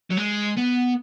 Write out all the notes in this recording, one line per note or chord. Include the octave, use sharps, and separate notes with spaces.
F#3
G#3
B3